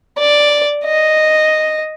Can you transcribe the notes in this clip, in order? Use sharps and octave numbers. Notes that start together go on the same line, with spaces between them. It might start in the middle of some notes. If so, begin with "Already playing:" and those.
D5
D#5